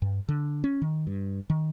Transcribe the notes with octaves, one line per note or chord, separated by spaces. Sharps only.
G2
D3
C#4
D#3
G2
D#3